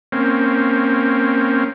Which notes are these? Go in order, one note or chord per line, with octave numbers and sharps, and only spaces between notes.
A#3 C4 C#4